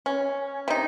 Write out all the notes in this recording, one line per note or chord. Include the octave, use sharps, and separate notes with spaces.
C#4
C3 D#4